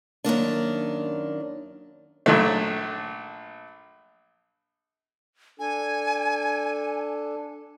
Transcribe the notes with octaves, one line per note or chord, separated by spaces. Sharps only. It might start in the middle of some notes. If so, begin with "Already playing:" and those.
F#2 D#3 A#3 D4
A#1 F#3 A3
D4 A4 G#5